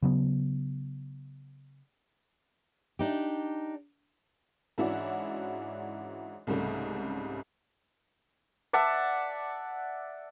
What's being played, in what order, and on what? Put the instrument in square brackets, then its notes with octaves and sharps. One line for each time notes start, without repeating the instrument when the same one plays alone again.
[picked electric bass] C#3 F#3 B3
[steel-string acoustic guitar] D4 D#4 G4
[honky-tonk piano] G#2 E3 C#4 D4 E4 F#4
C2 G#2 C#3 G3 A3
[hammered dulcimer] D5 E5 F#5 A5